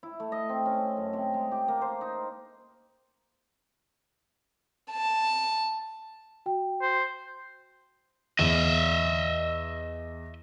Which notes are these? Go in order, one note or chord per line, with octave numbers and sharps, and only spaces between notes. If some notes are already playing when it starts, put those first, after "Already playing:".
E4
A3
D#5
C4
C#4
F#2
C3
G#3
G4
A#3
C5
D#4
A5
F#4 G5
C5
E2 D#5 E5